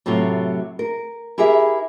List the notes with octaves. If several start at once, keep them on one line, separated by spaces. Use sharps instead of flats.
A2 C3 F#3 A3 F4
A#4
E4 G4 G#4 A#4 E5